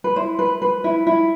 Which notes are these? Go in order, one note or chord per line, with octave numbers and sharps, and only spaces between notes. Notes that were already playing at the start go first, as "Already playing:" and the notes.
B4
E4 C5
B4
B4
E4
E4